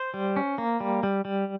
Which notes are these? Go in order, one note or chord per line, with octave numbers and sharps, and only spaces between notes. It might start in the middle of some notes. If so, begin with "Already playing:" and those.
Already playing: C5
G3
C#4
A#3
G3
G3
G3